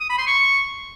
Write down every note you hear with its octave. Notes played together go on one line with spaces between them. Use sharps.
D#6
B5
C6
C#6